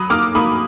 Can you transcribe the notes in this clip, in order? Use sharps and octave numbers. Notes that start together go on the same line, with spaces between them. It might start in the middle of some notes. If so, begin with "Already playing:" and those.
Already playing: F#3 B5 D#6
A#3 D6 F6
A#3 B5 D#6